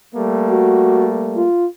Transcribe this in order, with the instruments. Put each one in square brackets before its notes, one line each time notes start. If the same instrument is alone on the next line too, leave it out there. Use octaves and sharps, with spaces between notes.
[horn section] G3 A3 A#3
[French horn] F#4
F4